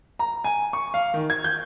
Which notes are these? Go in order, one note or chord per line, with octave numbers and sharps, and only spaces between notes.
A#5
G#5
C#6
F5
D#3
G#6
G6